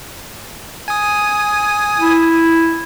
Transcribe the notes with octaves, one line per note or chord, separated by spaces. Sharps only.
G#5 D#6
E4